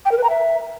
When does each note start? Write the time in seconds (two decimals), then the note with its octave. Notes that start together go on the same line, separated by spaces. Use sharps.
0.05 G5
0.11 A#4
0.17 B4
0.23 A#5
0.30 E5